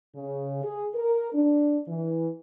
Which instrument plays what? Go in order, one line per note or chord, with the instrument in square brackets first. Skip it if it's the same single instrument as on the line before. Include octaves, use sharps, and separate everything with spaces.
[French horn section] C#3
G#4
A#4
D4
E3